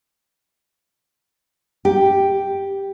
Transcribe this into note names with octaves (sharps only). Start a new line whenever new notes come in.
G4